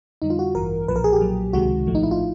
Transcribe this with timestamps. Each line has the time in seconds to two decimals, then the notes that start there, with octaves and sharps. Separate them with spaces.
0.22 F2 D3 G3 D#4
0.30 F4
0.39 F#4
0.55 A1 G2 E3 A#4
0.88 B1 A#2 F3 B4
0.96 A#4
1.04 G#4
1.13 G4
1.21 B1 A#2 F#3
1.53 C#2 C3 D#3 G#3 F#4
1.87 A#1 A2 F3 A3
1.95 D#4
2.03 E4
2.11 F4